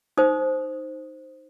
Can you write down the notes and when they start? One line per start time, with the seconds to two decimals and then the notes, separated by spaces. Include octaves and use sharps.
0.17 D#4 C5 D#6